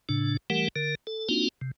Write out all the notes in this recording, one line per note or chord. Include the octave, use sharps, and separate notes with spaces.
A2 C#3 D4
E3 G3 A3 G4 A#4 F#5
D3 A#4
A4
A#3 C4 D4 D#4 F4 F#4
C3